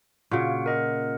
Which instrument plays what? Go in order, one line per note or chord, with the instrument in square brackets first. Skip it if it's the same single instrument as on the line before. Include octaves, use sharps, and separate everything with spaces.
[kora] A#2 C#3 [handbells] F#4 F#5 D7
[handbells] A#4 D#5 F#5